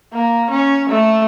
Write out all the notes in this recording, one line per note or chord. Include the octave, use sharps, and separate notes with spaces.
A#3
C#4
A3